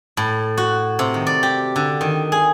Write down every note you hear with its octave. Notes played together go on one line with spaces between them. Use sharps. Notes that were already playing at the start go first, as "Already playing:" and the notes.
A2
F#4
C3
D#3
D5
G4
D3
D#3
G#4